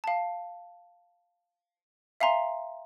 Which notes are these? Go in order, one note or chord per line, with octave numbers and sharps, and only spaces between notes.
F5 A5
E5 F5 G#5 A#5 C6